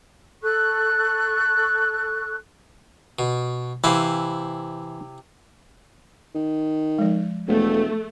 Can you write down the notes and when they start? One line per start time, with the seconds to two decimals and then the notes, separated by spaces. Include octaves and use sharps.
0.42 A4 C#6 F#6
3.19 B2
3.84 C3 E3 E4 C5 F5
6.35 D#3
6.99 F3 G#3
7.47 E1 A3